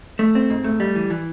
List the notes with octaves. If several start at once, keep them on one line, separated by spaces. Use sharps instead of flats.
A3
C4
G#2
A3
G3
E3
E3